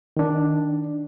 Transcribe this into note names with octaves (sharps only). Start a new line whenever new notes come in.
D#3 D4